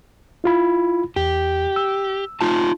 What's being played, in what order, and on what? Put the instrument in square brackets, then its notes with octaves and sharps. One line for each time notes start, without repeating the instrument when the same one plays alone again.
[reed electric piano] E4 F4 B5
[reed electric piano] E2 [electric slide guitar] G4
[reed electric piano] E6
[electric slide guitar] D#4 F4 A5